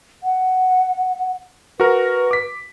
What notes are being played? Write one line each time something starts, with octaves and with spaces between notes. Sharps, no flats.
F#5
F#4 A#4 B4
D6 B6